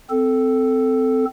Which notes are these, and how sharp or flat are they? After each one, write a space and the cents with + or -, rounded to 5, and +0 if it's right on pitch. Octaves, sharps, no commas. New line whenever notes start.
C4 -20 A4 +0